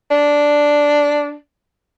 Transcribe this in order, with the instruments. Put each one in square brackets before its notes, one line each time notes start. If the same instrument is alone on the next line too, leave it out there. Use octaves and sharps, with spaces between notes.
[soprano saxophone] D4